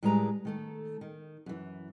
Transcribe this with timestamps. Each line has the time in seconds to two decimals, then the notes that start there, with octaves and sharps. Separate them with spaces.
0.03 A2 G3 G#3 G#4 B4 A#5
0.45 D#3 A3 A4
1.01 D#3
1.46 F#2 E3